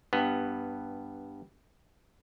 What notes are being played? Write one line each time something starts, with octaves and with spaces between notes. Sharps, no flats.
G2 B3